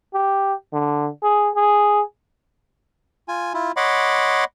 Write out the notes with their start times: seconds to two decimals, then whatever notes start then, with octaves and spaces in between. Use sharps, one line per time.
0.14 G4
0.73 D3
1.23 G#4
1.55 G#4
3.28 F4 G#5
3.54 E4 F4
3.77 C#5 D#5 F#5 B5 C6 D6